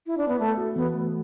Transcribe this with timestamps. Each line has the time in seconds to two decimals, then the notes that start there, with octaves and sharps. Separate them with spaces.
0.07 E4
0.18 D4
0.28 B3
0.39 A3 A4
0.57 F#4
0.76 E3 B3
0.94 A3